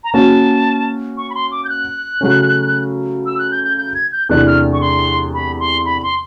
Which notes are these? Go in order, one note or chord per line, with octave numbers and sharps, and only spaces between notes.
A#5
A#3 C#4 F#4 A5
C#6
B5
C6
D6
G6
F#6
C#3 F#3 A3 C#4
E6
F#6
G6
G6
G6
G#6
G6
E2 C3 E3 A3 D4 F#6
F6
C#6
C6
B5
C6
B5
C6